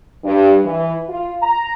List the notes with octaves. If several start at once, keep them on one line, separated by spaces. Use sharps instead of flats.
G2
E3
F4
A#5